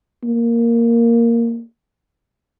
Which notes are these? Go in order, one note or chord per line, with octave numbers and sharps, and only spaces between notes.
A#3